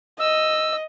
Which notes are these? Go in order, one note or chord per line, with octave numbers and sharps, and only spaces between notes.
D#5 E6